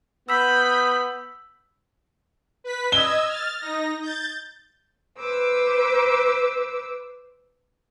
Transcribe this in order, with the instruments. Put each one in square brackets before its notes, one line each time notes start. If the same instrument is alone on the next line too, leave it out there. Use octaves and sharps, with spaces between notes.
[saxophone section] B3 [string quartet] B5 G6 [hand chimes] E6 B6
[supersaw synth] B4 B6
[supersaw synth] D#5 E6 G#6 [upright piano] G7
[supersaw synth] F6 A6
D#4 A#6
G6 A6
[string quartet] B4 C5 D6 E6